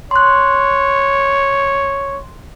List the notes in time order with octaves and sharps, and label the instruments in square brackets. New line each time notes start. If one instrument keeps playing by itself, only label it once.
[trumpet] C#5 [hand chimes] C6 F#6